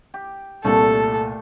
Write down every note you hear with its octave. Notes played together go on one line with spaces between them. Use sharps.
G4
C2 A#2 A3 A4